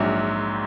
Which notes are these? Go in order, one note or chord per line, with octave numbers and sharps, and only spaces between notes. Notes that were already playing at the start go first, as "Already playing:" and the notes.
Already playing: A#1 G#2 F#3